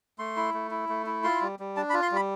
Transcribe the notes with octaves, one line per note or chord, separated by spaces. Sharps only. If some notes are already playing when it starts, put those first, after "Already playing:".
A3 C6
E4
A3
E4
A3
E4
F4 C6
G3
G3
D4 A5
B5
F4
C6
G3 B5